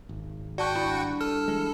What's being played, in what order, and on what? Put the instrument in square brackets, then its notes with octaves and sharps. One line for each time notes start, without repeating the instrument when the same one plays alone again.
[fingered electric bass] G#1
[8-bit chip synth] F#4 F#5 G5 [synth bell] D5 A5 C#6
[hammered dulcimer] G2 B4 C6 [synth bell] E4
[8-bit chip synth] A4 [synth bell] F6
[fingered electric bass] E3 G#3